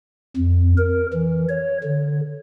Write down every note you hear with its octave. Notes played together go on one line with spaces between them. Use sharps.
F2
A#4
E3
C#5
D3